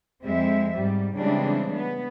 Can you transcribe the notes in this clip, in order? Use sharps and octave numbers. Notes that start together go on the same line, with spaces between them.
F2 G#3 C4 E5
G#2 G3
C#3 E3 G3 G#3 C4 D4
B3